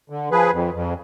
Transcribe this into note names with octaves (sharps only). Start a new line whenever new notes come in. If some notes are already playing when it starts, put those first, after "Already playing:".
D3
F3 G#4 B4
F2
F2